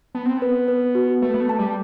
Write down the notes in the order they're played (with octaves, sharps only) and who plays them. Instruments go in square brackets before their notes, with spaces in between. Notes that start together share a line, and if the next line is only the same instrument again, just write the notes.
[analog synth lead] B3 [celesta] A5
[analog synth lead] C4
[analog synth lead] B3 [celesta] B4
[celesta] B4
F#4
[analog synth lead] A3 [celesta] B4
[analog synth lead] B3
A3
[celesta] A5
[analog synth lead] G3